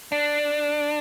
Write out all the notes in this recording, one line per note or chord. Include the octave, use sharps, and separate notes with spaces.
D4